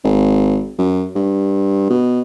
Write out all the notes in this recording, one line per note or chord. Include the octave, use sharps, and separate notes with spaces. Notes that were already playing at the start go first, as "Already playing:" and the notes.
G#1
F#2
G2
B2